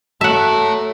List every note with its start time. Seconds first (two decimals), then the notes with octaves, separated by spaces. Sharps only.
0.21 F#3 A3 C#5 E5 F#5 A5